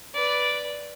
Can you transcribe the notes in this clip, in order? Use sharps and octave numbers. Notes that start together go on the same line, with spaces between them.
B4 D5